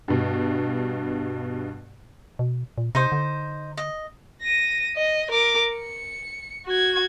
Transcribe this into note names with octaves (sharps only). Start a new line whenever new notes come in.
G2 B2
B2
A#2
C3 D#4 C5
D3
D#5
A#6 D#7
D#5
A#4 D6
C#7
F#4 G#6